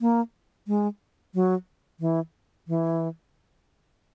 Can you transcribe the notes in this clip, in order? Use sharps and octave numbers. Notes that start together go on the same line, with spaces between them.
A#3
G#3
F#3
E3
E3